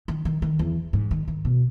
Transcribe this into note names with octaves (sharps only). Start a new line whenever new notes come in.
D#3
D#3
D#3
E2
G#2
D#3
D#3
B2